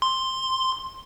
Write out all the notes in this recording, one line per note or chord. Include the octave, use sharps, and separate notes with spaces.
C6